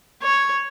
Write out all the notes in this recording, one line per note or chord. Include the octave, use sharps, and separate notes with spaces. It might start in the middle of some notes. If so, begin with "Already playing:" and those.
C#5